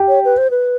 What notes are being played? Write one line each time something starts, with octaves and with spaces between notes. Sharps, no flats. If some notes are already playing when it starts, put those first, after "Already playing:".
Already playing: G4
C#5
B4
C5
B4